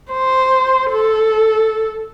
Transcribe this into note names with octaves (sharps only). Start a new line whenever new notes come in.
C5
A4